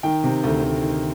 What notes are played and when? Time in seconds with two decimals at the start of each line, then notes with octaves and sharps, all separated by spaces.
0.03 D#3 G5
0.24 C3
0.44 D2
0.63 D2
0.83 D#3